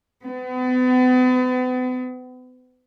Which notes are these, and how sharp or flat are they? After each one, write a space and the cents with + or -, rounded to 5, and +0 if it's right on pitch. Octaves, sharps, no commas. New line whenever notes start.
B3 +40